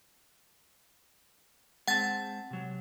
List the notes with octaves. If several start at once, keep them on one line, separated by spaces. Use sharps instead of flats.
G#3 C4 F#5 A5 A6
C3 F#3